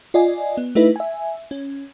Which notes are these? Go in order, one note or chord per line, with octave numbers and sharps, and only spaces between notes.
F4 D5 D#5 G#5
B3
A3 D#4 E4 B4
E5 G#5
C#4